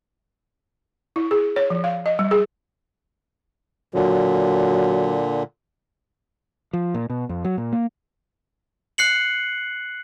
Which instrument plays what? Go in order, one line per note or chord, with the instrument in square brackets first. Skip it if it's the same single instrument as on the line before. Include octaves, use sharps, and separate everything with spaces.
[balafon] E4
G#4
C#5
F3
F5
D#5
G3
G#4
[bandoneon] A#2 D3 [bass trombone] F#3
[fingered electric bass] F3
A#2
B2
F2
F#3
A#2
A#3
[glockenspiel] F#6 C7 C#7 F#7